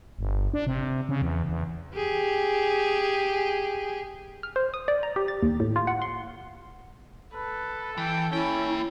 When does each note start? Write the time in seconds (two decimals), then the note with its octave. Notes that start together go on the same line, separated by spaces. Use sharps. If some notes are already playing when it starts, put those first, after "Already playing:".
0.19 G1
0.54 D4
0.67 C3
1.09 C#3
1.22 E2
1.49 E2
1.96 G4 G#4
4.43 F6
4.56 C5
4.74 D#6
4.88 D5
5.03 A#5
5.16 G4
5.28 A6
5.43 D#2
5.60 A2
5.76 F4
5.87 F#5
6.02 C6
7.33 A4 B4
7.98 E3 G5
8.33 A#3 C#4 E4 G5